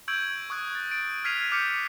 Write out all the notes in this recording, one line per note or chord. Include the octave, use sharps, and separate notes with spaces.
C#6 E6 G6 G#6 D7 F#7
C#6 D#6 F#6 G#6
A6
D7
F6 G#6 B6 C7 D#7 F7
D6 F6 G6 B6 C#7